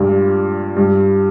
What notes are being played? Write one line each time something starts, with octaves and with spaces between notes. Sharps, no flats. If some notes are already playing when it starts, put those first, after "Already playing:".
Already playing: G2 A#2
G2